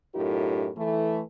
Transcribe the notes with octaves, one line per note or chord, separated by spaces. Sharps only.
F#2 A2 D#4 F4 G4 A#4
E3 A3